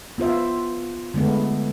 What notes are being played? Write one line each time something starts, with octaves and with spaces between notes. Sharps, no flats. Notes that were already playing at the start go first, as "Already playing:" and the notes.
B3 F4 C5 E5
D3 G#3 A3 B3